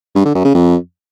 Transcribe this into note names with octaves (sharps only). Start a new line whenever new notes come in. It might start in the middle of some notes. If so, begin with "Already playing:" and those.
G2
D3
F#2
C#3
F2